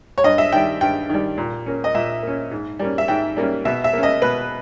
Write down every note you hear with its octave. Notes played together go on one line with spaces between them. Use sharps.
C#5
G2 D#5
E5
D#3 G3 G5
G2 G5
D#3 G3
A#2
A#3 C#4
D#5
A#2 E5
A#3 C#4
G#2
G3 A#3 C#4
E5
G#2 G5
G3 A#3 C#4
B2 E5
E5
A#3 C#4
D#5
B2 B4